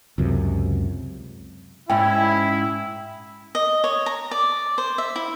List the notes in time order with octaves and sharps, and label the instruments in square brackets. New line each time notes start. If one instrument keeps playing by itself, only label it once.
[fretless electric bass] C#2 F#2 C3
[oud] G#2 C#4 [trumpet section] E4 [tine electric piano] G5
[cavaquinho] D#5
C#5
A#5
D5
C5
E5
E4